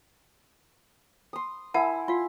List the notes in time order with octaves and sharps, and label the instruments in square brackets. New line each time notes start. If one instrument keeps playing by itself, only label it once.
[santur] C6 D#6
[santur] E4 G#5 [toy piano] A#4 F#5 A5
[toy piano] F4 F5 [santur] C6